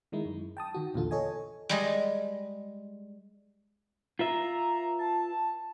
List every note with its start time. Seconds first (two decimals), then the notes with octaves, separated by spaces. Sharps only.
0.12 D#3 G#3 D#4 E4
0.25 F#2
0.57 G5 A5 D#6
0.74 D#3 F#4
0.94 A#1 E2 A#2 D3 F4 A4
1.11 A4 C#5 D#5 G#5
1.69 G3 G#3 D#5
4.19 F4 B4 E5 A#5
4.99 A5